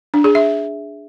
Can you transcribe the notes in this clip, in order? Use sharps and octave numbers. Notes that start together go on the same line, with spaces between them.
D4
G#4
E5